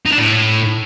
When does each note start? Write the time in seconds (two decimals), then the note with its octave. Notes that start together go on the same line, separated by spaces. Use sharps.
0.06 D#4
0.12 D4
0.18 A2